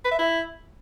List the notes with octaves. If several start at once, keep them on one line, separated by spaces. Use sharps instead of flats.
B4
E5
E4